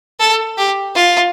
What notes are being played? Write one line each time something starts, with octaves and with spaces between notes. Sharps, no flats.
A4
G4
F4